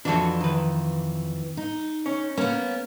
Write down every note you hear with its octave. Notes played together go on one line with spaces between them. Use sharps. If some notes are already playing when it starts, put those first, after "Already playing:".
F2 E3 D4 F#4 A4
D#3 B4
D#4
C#4
A#3 B3 C#4